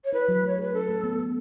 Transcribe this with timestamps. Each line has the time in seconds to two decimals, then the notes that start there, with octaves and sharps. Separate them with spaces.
0.04 C#5
0.13 E4 B4
0.29 F#3
0.43 A3 C#5
0.58 G#4 B4
0.73 C#4 A4
0.89 A3
1.04 B3
1.19 B3